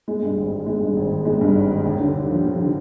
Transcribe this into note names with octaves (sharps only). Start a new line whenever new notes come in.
G#3
G2
G#1
D#3
G#3
G2
G#1
D#3
G#3
G2
G#1
D#3
D#2
D3
D#2
F3
D#2
D3